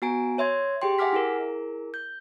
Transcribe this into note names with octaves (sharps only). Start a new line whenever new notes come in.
B3 F#4 G#5 A#5 D7
C#5 E5 C6 G#6
G4 G#4 G5 C6
E5 F#5 G#5 D6 F6 B6
E4 G#4 A#4
G6